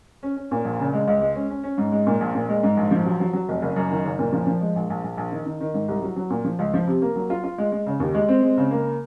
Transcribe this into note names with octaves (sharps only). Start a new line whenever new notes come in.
C#4
C#4
A#2
A#1
C#3
G#3
C#2
G#3
C#4
C#4
C#4
G#2
G#3
A#2
A#1
A#2
G#3
G#2
A#1
F3
F#3
F#3
F#3
F1
F#1
F#2
D#3
F#1
A#2
F3
F3
G#3
A#1
A#1
A#1
A#1
D#3
D#3
D#3
G#2
C2
F#3
F#3
A#2
F3
C#2
F3
C3
A#3
F#3
F4
F4
G#3
G#3
C#3
D#2
G#3
C4
G#3
C#3
A#3